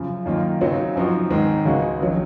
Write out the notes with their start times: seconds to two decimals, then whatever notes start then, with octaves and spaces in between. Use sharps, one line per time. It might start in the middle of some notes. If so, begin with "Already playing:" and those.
Already playing: F#2 C#3 F3
0.26 F#2 D#3 A#3 F4
0.61 F#2 C#3 F#3 C4 D#4
0.96 F#2 F3 C4 D#4 F#4
1.31 G#2 D#3 G#3 C4
1.65 C#2 C#3 G#3 D#4 F#4
2.00 A#1 D#3 F#3